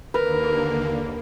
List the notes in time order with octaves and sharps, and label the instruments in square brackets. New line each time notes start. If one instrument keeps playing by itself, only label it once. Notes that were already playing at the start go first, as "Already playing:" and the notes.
[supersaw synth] D#2 D3 A#3 [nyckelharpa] A#4 [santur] B4